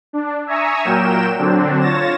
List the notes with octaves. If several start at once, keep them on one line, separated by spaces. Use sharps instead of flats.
D4
E5 G#5 A#5 C#6 D#6 E6
A#2 F#3 A#4 G5 E7
D3 F#3 C4 D4
F4 C#5 A6 A#6 E7